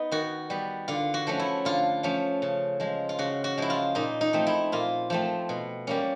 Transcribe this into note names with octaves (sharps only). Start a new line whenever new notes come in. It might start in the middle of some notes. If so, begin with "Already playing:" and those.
Already playing: B3 D#4
D#3 F#4
G3 B3
D3 F4
F#4
F3 A3 C#4
E4
D3 F4
F3 A3 C#4
C#3
F3 G#3
F4
C#3 F#4
F#4
F3 G#3 E4
F4
A#2 D#4
D#4
F3 A3 C4
E4
A#2 F4
F3 A3 C4
B2
G3 A#3 C#4